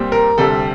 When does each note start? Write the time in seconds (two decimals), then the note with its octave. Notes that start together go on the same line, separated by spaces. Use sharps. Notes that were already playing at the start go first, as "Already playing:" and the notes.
Already playing: A#2 G3 C4
0.12 A#4
0.38 D2 C3 G3 A4